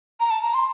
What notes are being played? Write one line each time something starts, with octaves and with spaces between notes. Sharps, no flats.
A#5
A5
A#5
C6